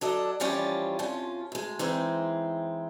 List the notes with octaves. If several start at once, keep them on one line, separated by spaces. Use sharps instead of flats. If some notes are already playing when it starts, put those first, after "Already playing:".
F#3 D4 A4 D#5
E3 F3 G3 C#4 F4
F2 F3 C#4 F4
D2 G#3
E3 G#3 C4 D#4